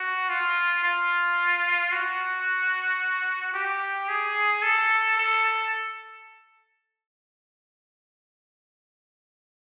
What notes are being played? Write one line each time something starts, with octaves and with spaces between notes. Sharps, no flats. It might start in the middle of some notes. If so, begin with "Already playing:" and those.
Already playing: F#4
F4
F4
F#4
G4
G#4
A4
A4